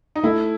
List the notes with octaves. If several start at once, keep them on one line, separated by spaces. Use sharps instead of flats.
D#4
A3 E4